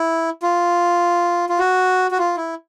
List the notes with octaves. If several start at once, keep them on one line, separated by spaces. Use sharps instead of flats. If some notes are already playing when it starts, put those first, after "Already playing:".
Already playing: E4
F4
F4
F#4
F#4
F4
E4